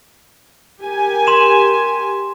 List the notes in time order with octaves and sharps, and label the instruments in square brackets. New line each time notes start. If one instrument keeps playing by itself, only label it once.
[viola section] G4 A#4 G#5
[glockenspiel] C6 E7